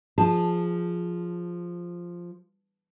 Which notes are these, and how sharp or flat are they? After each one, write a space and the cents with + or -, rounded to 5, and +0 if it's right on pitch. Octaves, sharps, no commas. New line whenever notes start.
F3 +0 G#4 +0 A5 +0